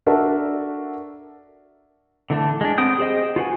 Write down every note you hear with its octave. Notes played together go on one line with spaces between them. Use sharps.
D4 F#4 A4 A#4 D5 E5
D3 E3 A3 D4
G#3 D4
B3 C4 G5 D#6 G6
G4 G#4 C5 D#5 G5
F4 F#4 B4 G#5